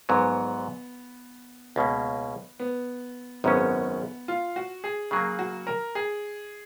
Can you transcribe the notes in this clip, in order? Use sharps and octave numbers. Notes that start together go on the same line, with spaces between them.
A#1 G#2 F#3 B3
C#2 B2 A#3 C#4
B3
G#1 F#2 C#3 G#3 B3 C#4
F4
F#4
G#4
C#3 F#3 A#3 G#4
F#4
A#4
G#4